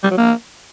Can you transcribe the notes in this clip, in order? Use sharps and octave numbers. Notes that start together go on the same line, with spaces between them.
G3
F#3
A#3